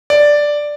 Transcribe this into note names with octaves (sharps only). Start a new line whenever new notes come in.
D5